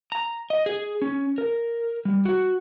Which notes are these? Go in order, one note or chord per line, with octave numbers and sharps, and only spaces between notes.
A#5
D#5
G#4
C#4
A#4
G3
F#4